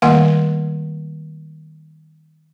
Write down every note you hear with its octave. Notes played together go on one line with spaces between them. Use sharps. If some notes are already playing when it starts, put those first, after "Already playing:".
D#3 G3 A3 A#3 F#5 G#5